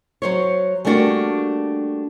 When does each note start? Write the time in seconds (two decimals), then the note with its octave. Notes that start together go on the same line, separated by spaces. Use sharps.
0.22 F#3 C5 C#5
0.85 G3 A3 A#3 D4 F#4